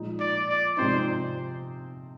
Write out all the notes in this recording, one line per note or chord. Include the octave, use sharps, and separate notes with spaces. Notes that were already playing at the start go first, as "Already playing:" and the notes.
Already playing: A#2 F3 G#3 D#4
D5
D5
C3 F3 G#3 C4 D#4 C5